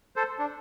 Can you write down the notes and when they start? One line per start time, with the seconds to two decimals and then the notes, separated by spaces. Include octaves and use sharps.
0.16 A4 C5
0.39 D4